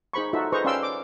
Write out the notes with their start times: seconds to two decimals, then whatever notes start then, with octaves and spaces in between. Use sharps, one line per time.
0.13 D#4 G#4 C5 B5 C#6
0.33 D#4 F4 F#4 A4 E5
0.52 G#4 B4 C5 D#5 A#5 C#6
0.65 C#4 D5 F5 G5 C6 E6
0.83 D6